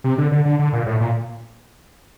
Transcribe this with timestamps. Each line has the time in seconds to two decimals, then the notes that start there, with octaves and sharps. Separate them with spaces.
0.04 C3
0.18 D3
0.32 D3
0.45 D3
0.59 D3
0.73 A#2
0.86 A2
1.00 A#2